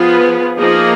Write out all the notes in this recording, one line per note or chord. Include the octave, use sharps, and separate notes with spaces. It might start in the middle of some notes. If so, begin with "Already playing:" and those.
Already playing: F3 B3 F4 G#4 B4
F3 A#3 D#4 G#4